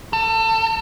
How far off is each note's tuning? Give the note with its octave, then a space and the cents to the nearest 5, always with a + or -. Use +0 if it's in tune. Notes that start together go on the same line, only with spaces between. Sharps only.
A4 +30